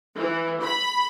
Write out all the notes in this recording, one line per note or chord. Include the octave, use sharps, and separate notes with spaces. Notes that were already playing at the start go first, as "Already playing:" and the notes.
E3
B5